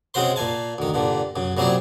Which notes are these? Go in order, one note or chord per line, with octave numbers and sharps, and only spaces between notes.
C#3 G#3 C4 F#4 C5 C6
A#2 F5 G#5 A5
D2 D#3
G2 A#2 D3
F#2 C#3
A#2 F#3 G3 C4 C#4 G#4